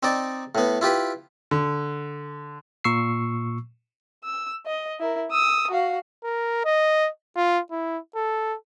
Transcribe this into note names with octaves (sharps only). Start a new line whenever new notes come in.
C4 D#4 D5
A2 B3
E4 F4 G4 B4
D3
A#2 C#6 E6 C7
E6
D#5
E4 A#4
D#6 E6
F#4 F5
A#4
D#5
F4
E4
A4